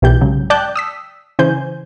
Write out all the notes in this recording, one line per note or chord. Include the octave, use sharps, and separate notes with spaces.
B1 E3 G4 G6
G#2 C#3 F#3
D5 G5 A5 D6 F#6 G6
D#6 E6 B6
C#3 E3 C5 G#5 G6